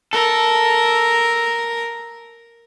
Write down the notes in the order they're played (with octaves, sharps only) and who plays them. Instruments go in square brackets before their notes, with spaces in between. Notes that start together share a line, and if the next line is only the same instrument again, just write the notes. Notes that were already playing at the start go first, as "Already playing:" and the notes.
[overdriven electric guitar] A4 [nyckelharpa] A#4